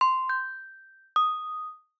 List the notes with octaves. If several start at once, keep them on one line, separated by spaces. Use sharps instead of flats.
C6
G6
D#6